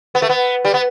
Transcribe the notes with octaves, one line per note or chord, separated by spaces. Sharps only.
B3
A3
B3
G3
B3